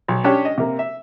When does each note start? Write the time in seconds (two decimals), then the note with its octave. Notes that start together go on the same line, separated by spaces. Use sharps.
0.08 B1
0.24 C#4 D4 G4 C#5
0.45 D#5
0.58 C3 A#3
0.79 E5